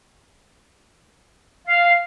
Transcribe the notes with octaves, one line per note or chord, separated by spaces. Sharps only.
F5